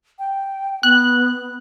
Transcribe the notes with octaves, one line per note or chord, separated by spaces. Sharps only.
G5
B3 F#6